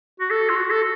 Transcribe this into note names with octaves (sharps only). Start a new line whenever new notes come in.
F#4
A4
F4
F#4
A4